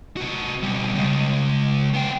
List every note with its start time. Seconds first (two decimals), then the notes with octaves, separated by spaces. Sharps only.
0.17 C3 F#4
0.63 B2 G3
0.95 C#3 G#3
1.94 B3 G5